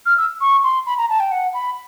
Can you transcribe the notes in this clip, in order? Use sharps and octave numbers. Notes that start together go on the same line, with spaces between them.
F6
E6
C#6
C6
B5
A#5
A5
G5
F#5
B5